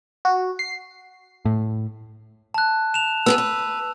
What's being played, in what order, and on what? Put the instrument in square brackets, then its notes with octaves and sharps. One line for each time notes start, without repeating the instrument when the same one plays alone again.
[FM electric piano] F#4
C7
[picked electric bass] A2
[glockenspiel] A5 F#6
E7 F7
[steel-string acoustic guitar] B3 G4 G#4 [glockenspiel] E6
[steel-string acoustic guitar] B4